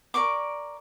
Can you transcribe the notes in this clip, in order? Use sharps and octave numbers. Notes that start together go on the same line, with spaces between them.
A#4 D5 C#6 D6